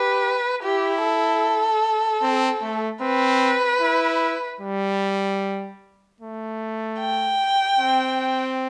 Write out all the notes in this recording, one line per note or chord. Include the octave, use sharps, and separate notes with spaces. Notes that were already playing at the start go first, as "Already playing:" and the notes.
Already playing: G4 B4
E4 G4
A4
C4
A3
C4 B4
E4
G3
A3
G5
C4